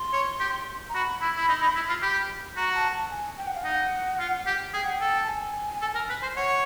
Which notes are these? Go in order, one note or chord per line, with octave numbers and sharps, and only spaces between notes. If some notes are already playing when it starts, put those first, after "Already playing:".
Already playing: C6
C#5
G4
A#5
F#4 B5
E4
E4
D#4
D#4
E4
F4
G4
F#4 A#5
A5
A5
G#5
G5
F#5
F5
D#4 F#5
F4
G4
G#4 G5
F#5
G5
A4
A5
G#5
A4
A#4
B4
C5
C#5 F#5